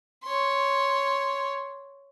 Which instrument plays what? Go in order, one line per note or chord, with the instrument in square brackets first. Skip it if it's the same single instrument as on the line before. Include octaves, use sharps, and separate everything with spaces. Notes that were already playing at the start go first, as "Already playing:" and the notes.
[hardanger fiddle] C#5 C6